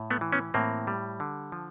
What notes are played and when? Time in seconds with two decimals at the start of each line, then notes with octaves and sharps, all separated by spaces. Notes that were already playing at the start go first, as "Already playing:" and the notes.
Already playing: A2
0.10 A3 B3
0.21 E3
0.33 B3 C#4
0.54 A2 A#3 C4
0.87 G3
1.20 D3
1.52 F3